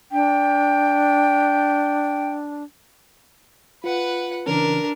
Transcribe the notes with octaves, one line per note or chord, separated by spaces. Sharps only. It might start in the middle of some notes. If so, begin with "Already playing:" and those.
D4 G5
F4 B4 F#5
C#3 E3 C#4 D4 A#4